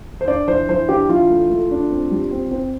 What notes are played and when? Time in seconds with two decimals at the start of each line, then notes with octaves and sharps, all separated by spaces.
0.21 C5
0.28 D4 D5
0.48 E3 C5
0.69 E3 C5
0.89 D4 G4
1.09 E3 F4
1.30 A3
1.50 A3
1.71 D4
1.91 C4
2.11 G3
2.31 C4
2.51 C4